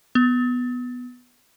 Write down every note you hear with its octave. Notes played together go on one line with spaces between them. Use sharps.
B3